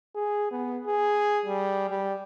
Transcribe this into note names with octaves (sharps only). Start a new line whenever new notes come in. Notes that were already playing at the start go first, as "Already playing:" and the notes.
G#4
B3
G#4
G3
G3